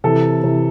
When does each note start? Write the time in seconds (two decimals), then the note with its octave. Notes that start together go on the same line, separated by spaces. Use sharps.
0.04 C3 E3 A4
0.43 C3 E3